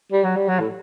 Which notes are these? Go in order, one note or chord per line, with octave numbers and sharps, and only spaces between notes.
G3
F#3
G3
F#3
A2